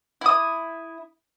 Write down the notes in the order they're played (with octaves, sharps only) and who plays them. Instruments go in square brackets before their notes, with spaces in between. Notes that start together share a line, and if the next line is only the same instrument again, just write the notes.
[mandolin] E4 D#6